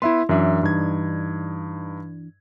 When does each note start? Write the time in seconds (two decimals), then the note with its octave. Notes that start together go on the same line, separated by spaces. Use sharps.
0.02 B3 E4 B4 E5 C6
0.29 F#2 E3 D4 E5
0.63 G2 D#4 G#6